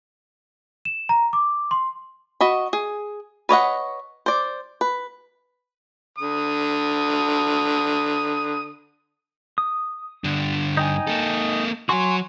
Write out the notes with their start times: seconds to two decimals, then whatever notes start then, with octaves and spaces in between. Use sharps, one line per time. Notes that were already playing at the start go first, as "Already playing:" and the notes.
0.85 E7
1.09 A#5
1.33 D6
1.71 C6
2.41 F#4 D#5 B5
2.73 G#4
3.49 B4 C#5 D#5 F#5
4.26 C5 D5
4.81 B4
6.18 D3 D#6
9.58 D#6
10.24 G2 D3
10.77 D#4 G5 G#5
11.08 A#3 A4
11.89 F#3 F#4 G#5 C6 C#6